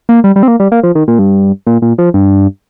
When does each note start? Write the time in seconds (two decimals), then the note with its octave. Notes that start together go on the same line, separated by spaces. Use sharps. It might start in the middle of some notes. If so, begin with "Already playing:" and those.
0.09 A#3
0.24 G3
0.36 G3
0.43 C4
0.48 A#3
0.60 G3
0.72 A#3
0.83 F3
0.95 D#3
1.08 A#2
1.19 G2
1.67 A#2
1.82 A#2
1.98 F3
2.14 G2